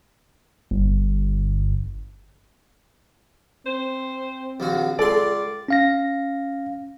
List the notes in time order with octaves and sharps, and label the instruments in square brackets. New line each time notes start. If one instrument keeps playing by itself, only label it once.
[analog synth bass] G1
[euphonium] C4 [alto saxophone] C5
[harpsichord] A#1 D#2 F#4
[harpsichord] C#2 C6 [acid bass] A4 [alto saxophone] D5
[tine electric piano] C#4 F5 A#6